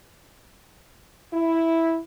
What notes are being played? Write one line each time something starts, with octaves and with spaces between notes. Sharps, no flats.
E4